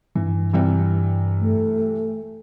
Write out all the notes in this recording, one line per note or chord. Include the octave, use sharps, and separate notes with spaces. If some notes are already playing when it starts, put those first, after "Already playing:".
G2 E3
C3 E3 G3
A3